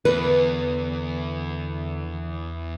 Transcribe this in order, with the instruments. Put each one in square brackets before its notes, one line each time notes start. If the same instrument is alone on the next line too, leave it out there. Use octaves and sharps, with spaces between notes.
[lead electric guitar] E2 [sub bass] D3 [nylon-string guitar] B4